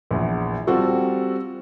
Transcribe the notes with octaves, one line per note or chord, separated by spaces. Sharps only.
A#1 E2
G3 C4 F4 F#4 A4